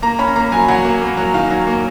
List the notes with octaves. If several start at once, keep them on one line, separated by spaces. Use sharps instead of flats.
A#3 A#5
C#4 B5
A#3 A#5
F#3 G#5
F#3 F#5
A#3
A#3
F#3
D#3 F5
F#3
A#3